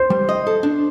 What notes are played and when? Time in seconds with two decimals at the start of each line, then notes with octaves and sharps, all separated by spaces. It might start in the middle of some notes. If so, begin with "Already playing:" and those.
Already playing: C5
0.10 G3
0.29 D#5
0.47 A4
0.63 D4